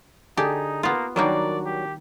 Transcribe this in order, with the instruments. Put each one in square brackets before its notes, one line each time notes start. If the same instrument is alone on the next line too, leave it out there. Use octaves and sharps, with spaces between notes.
[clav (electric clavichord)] D3 G#4 A5 [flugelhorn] D#4 [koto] G4
[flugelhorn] A#3 [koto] B3 F4
[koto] D#3 G3 A#3 [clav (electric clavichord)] F#3 D4 F#4 [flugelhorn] D5
[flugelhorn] G4